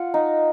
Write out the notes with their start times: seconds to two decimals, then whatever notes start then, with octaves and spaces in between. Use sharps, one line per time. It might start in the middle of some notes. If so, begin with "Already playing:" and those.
Already playing: F4 F#5
0.14 D#4